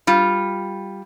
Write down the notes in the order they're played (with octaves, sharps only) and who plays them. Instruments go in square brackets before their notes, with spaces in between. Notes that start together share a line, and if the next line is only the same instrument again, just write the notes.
[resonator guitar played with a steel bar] G3 F4